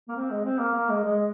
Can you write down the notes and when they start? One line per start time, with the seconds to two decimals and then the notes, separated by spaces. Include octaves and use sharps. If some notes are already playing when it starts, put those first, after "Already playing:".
0.08 A#3
0.16 C4
0.31 G#3
0.45 C4
0.60 A#3
0.74 A#3
0.89 G#3
1.04 G#3